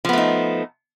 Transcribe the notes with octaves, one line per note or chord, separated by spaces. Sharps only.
F3 A3 B3 D#4